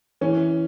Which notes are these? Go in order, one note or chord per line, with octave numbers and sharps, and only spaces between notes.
E3 C#4